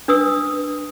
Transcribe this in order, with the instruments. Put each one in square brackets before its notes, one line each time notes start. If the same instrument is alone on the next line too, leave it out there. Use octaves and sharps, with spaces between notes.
[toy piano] D4 B4 D#6 E6